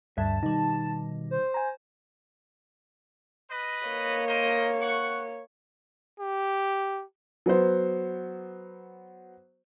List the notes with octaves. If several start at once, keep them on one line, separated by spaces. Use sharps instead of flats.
D2 G2 E5 A5
B2 D#3 G3 D#4
C5
G#5 A#5
B4 D#5
A#3 C#5
A#4 C5 D#5
F#5 C#6
G4
F#3 B3 C5